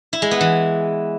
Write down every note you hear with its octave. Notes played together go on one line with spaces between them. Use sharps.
E4
G#3
B3
E3